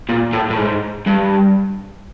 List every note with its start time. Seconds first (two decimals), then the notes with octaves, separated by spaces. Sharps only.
0.09 A#2
0.33 A2
0.50 A2
0.58 G#2
1.06 G2